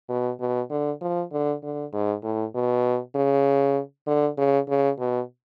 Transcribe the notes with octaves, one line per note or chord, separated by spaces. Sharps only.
B2
B2
D3
F3
D3
D3
G#2
A2
B2
C#3
D3
C#3
C#3
B2